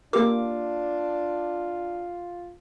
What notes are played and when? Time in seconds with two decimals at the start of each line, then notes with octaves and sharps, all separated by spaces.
0.13 A#3 D4 F4 G4 A#4 D6